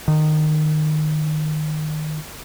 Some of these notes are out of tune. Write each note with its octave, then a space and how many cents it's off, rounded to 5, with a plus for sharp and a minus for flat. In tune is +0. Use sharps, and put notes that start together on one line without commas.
D#3 -20